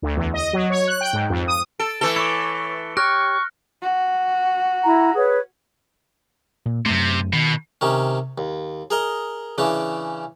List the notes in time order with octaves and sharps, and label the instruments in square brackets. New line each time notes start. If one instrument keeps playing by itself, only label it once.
[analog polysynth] D2
E2
D#5
F#3
C#5
F#6
G5
G#2
F2
D#6
[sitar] A4 [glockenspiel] D7
[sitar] E3 A3 A4 [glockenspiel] C#7 G7
[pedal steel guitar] E4 C#5 D6 [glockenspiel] C#7
[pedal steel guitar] G4 C#5 G5 [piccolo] C#6 [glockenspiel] F6 F#6 A#6
[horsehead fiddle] F#4
[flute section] E4 A#5
G#4 B4 C#5
[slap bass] A#2
[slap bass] F#2 A3 [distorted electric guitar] C3
[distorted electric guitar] B2 [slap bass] D#3
[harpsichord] C3 D#3 C#4
D#2
G#4 A#4 D#5
C#3 E3 C#4 D4